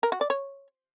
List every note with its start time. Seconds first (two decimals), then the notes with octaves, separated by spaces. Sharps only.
0.03 A#4
0.12 F#4
0.21 D5
0.30 C#5